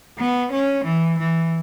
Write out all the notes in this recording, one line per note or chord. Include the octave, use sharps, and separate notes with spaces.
B3
C#4
E3
E3